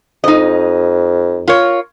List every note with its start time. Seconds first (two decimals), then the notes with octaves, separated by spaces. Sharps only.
0.24 F2 D#4 D#5
1.48 F4 A#4 C#5